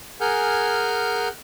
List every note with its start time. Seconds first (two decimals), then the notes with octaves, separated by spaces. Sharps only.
0.21 G#4 A#4 F#5 G#5 F6 G6